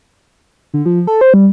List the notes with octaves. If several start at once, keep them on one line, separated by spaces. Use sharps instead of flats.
D3
F3
A4
C5
G3